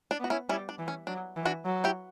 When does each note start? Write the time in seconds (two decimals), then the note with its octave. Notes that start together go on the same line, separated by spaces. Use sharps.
0.11 D4
0.20 B3
0.24 F#4
0.30 C#4 E4
0.49 G3 C#4 E4
0.69 D4
0.79 E3
0.88 C#4
1.07 F#3 D4
1.36 E3
1.45 D4 F#4
1.66 F#3
1.84 E4 G4